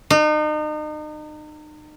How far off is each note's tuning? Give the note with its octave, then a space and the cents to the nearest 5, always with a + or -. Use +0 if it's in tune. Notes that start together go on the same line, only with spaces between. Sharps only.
D#4 -35